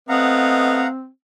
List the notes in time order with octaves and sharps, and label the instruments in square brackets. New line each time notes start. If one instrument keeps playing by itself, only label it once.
[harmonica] A3 B3 D#5 [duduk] C4 [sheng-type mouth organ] F5 F#5 A#5